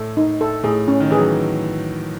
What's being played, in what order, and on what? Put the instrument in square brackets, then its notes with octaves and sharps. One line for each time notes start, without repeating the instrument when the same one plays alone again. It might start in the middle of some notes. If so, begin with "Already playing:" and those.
Already playing: [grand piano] A2 [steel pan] A4
[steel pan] D#4
A4
[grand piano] A2 [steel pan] G#4
[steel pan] C#4
[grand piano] D#3
[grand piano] E3 [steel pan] G#4
[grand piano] F#3